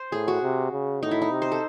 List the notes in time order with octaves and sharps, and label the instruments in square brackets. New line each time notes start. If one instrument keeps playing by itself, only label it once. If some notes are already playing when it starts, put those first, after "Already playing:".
Already playing: [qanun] C5
[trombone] A2 [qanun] G#4
[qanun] F#4
[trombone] C3
C#3
[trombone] A2 [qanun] D#4
[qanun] E4
D#4
[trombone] C3
[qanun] C5
A4